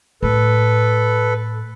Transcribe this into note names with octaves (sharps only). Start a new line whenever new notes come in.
A2 A4 B4